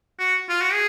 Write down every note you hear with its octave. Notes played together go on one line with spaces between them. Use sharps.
F#4
F4
F#4
G#4